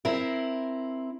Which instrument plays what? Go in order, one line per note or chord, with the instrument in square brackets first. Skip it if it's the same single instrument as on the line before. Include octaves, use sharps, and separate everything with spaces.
[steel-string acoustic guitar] C4 E4 A#4